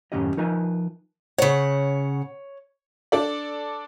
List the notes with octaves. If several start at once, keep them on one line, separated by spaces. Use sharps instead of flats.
F#2 A2 D#3 C#4 G4 D#5
F3 D#4 A#4 B4 G#5
C#3 C#5 F#5
D4 A4 D5